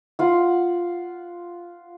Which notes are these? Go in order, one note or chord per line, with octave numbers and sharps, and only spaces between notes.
F4 F#5